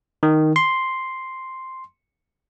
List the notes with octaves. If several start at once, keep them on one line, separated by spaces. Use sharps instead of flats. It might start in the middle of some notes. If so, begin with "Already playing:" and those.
D#3
C6